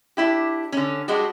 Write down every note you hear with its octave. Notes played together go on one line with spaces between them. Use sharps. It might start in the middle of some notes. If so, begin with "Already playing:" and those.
D4 E4 G4
D3 C#4
G3 G#3 D4 F#4